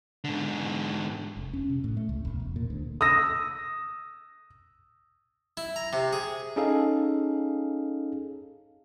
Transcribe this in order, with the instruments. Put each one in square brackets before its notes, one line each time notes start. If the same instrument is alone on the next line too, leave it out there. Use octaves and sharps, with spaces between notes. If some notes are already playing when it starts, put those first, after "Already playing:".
[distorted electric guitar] G#2 D3
[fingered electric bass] F1
C#4
C3
A2
A3
C#2
E1
E1
A#2
D2
[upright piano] D#6 E6 A#6
[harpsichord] E4
A#5
C3
G#4
[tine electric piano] C#4 D#4 G#4 A4 F5